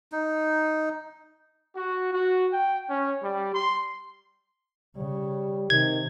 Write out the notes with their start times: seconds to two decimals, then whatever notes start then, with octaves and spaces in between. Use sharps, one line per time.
0.12 D#4
1.75 F#4
2.11 F#4
2.51 G5
2.88 C#4
3.21 G3
3.53 C6
4.96 C#3 G3
5.70 C3 D#3 G#6